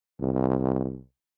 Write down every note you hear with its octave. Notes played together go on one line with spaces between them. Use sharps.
C2